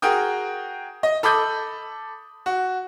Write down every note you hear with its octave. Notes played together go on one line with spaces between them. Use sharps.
F#4 G#4 A#4 G5 D#6
D#5
A4 B5 D6 D#6 G6
F#4